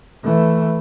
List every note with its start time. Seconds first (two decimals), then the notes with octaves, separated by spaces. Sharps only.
0.24 E3 A3